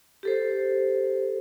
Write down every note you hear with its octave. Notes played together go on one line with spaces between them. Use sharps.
G4 A4 C5